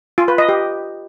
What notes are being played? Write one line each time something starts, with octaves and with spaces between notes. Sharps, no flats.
F4
B4
D#5
G4